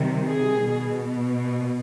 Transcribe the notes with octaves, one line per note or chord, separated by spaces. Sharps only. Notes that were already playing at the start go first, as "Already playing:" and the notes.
Already playing: C3 D#3 G3
G#4
B2